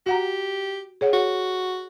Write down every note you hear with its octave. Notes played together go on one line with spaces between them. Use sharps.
F#4 G4 F#5 A#5
G#4 C#5 F#5
F#4